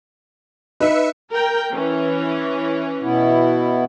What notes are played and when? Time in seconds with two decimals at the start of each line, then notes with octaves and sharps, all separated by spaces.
0.80 D#4 B4 E5 C#7
1.31 A#4 G5
1.73 E3 C#4
3.03 B2 B3 E4